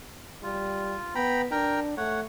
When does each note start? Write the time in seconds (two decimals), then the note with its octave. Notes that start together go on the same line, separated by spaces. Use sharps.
0.43 G3 F4
1.15 B3 G5 A#5 B5
1.51 D4 A#4 G5 A#5
1.97 A3 C#5 F#5